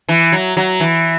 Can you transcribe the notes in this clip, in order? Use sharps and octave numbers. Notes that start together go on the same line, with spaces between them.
E3
F#3
F#3
E3